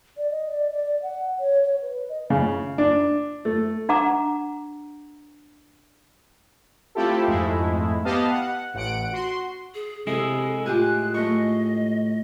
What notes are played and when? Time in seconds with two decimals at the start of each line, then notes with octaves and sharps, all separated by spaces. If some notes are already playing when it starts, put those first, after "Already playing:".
0.17 D5
0.31 D#5
0.50 D5
0.70 D5
0.84 D5
1.02 F#5
1.39 C#5
1.64 C#5
1.82 B4
2.09 D#5
2.30 C#3
2.78 D4
3.45 A3
3.89 D4 F#5 A#5 D6
6.95 A3 C4 E4 F4 G4 A4
7.27 F2 G#2 G#3 A3 E4
8.05 B3 G4 D#5 F5 A5
8.31 F#5
8.74 A1 F#5 D7
9.12 F#4 C6
9.74 G#4
10.07 C3 G#3 E4 G#4 A4
10.66 A2 F4 G4 G#5 F#6
11.14 A3 D#5 C#6